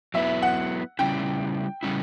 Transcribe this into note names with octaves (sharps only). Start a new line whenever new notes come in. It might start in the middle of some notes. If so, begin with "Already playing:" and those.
F#3 B3 E4 B4 E5
F#5
C#3 G3 C#4 E4 G5
C#3 G3 C#4 E4